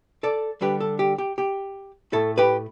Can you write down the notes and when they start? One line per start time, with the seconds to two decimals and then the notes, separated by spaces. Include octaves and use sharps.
0.23 A4 D5
0.61 D3 G3 D4 G4 B4
0.80 A4
0.99 G4
1.18 G4
1.38 G4
2.12 A2 A3 E4 A4
2.38 G4 B4